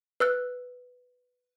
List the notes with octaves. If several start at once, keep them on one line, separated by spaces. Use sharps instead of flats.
B4 E6 F#6